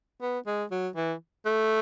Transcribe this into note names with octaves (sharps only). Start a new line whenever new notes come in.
B3
G#3
F#3
E3
A3